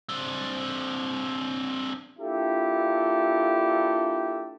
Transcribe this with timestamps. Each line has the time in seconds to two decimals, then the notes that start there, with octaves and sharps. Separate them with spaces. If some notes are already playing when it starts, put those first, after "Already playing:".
0.09 C4 D4
2.19 A#3 D4 E4 F4 G4 A4